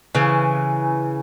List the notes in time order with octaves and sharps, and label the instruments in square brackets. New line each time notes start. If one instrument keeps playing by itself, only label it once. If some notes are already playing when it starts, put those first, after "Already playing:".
[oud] C#3 E3